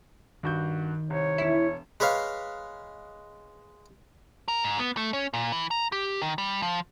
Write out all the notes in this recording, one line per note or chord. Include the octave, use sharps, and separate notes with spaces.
G2 D#3 F#4 G6
C2 C#5
E1 E4 E7
G#3 B4 C#5 F5
A#4
G#2
B3
A3
C#4
A#2
E3
A#5
G4
D#3
G3
F3